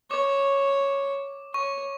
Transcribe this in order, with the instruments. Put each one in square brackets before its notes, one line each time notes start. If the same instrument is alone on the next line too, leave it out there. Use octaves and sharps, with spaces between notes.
[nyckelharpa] C#5 [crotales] D6
[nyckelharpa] C#5 [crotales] C#6